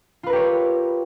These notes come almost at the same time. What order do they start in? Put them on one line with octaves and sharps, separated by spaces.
F4 B4 A#4 G4 C#5